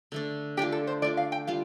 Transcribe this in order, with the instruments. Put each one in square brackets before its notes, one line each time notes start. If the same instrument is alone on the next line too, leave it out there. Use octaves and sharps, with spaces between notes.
[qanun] D3 A3 D4
[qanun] A3 D4 F4 [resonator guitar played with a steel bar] G4
[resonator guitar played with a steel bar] A4
C5
[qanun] A3 D4 F4 [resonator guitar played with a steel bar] D5
[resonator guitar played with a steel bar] F5
G5
[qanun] G3 F4 [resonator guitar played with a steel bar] F5